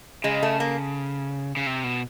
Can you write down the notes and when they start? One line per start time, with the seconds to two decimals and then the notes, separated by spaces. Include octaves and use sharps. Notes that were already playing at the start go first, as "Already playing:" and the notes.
0.24 C#3 G#3
0.43 A3
0.60 A#3
1.57 C#3
1.67 C3
1.84 B2